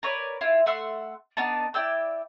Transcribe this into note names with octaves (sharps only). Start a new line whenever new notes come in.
A#4 B4 C#5 D5
E4 F4
A3 E5 F#5 C6
B3 D4 D#4 A5
E4 D5 G5 E6